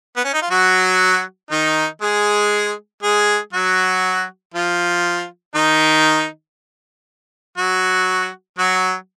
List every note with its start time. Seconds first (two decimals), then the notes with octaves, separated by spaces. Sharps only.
0.16 B3
0.24 C#4
0.33 D#4
0.42 F4
0.50 F#3 F#4
1.51 D#3 D#4
2.02 G#3 G#4
3.03 G#3 G#4
3.53 F#3 F#4
4.54 F3 F4
5.55 D#3 D#4
7.58 F#3 F#4
8.59 F#3 F#4